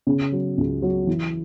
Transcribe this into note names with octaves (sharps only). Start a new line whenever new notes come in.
C#3
F#3
C#2
F#3
E3